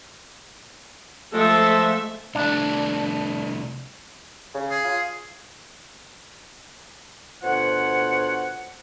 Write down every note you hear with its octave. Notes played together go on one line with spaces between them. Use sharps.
F3 G#3 A3 A4 E5
C2 A3 D4
C#3
G#4
F4
D2 B2 F4 C5 C#5 F#5